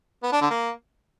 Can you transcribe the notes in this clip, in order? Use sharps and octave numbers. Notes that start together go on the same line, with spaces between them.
B3
D4
D3
A#3